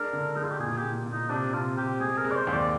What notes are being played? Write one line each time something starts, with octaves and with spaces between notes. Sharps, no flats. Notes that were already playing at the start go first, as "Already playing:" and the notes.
Already playing: G#3 D4 A#4
D3
G#3 D#4
F4
G4
A#2 G#4
G4
A#2
A#2
D#4
C3 D4
C3 F4
C3 G4
G#3 G#4
A#4
G#3
D5
C5
D#2
D5